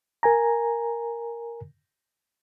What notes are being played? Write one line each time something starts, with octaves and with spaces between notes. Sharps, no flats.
A#4 G#5 A#5